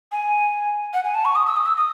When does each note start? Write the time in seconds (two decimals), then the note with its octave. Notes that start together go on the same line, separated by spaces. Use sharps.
0.12 G#5
0.94 F#5
1.04 G#5
1.15 A5
1.25 C#6
1.35 D#6
1.46 E6
1.56 D#6
1.66 E6
1.77 D#6